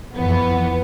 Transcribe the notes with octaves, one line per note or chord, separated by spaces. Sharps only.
F2 E3 B3